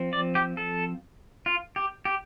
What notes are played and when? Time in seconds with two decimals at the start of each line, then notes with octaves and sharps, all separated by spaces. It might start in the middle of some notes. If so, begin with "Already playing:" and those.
Already playing: F3 C4
0.13 D5
0.35 G4
0.57 A4
1.46 F4
1.76 G4
2.05 G4